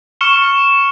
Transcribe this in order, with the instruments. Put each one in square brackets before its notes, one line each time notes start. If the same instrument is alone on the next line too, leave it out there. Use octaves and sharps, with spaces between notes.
[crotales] C#6 F6 C#7 E7 G7